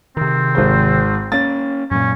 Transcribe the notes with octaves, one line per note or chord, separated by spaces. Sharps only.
C3 D#3 C4
G#1 G#3 C5
A#3 C#4 A6
F#2 A#2 C#4